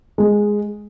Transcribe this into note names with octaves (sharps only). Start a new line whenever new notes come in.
G#3